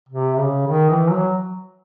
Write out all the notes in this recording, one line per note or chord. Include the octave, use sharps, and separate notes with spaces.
C3
C#3
D#3
E3
F#3